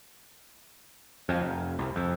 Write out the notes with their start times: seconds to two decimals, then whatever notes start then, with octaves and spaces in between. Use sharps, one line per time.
1.29 F2
1.41 F1
1.79 C2
1.96 F2